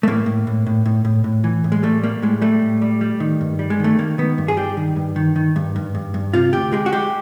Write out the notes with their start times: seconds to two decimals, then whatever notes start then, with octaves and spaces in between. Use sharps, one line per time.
0.03 A3
0.08 A2 A#3
0.26 A2
0.47 A2
0.67 A2
0.86 A2
1.05 A2
1.24 A2
1.44 E3
1.64 A2
1.72 G#3
1.83 G3 A3
2.03 G3 A#3
2.22 A2 G#3
2.42 G3 A3
2.62 A2
2.82 G3
3.01 G3
3.20 D#3
3.41 G2
3.59 G3
3.70 G#3
3.80 D#3 A3
3.98 D#3 A#3
4.18 D#3 B3
4.38 G2
4.48 G#4
4.57 G3 G4
4.77 D#3
4.96 G2
5.16 D#3
5.36 D#3
5.56 G2
5.76 G2
5.95 G2
6.14 G2
6.33 C3 F4
6.53 D2 G4
6.72 G#3 G4
6.86 F#4
6.93 G#3 G4